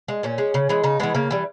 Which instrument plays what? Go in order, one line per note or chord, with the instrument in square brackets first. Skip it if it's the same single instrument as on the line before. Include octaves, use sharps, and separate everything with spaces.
[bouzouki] G#3
A#2 C#4
G#3
C#3
E3 G#3
C#3 D#4
E3 G#3 B3
C#3 A#3
E3 G3